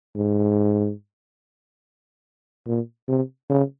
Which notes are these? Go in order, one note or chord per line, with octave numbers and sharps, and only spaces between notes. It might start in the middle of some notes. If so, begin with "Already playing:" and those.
G#2
A#2
C3
C#3